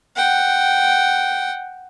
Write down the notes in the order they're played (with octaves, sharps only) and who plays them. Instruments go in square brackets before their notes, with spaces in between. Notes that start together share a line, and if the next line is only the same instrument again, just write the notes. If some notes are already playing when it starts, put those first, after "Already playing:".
[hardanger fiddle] F#5 G5